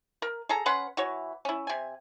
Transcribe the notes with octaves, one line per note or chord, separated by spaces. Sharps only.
A#4
G#4 A4 A#5
C#4 B4 F#5 C6
E3 F#4 C#5
C#4 E4
C3 G#5